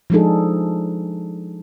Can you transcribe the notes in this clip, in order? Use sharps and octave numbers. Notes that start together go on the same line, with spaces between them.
F3 G#3 D4 D#4 G#4 A4